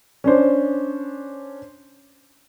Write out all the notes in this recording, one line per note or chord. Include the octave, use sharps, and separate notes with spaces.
C#4 D4 C5